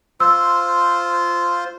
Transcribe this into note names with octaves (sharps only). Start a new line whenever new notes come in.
F4 C5 E6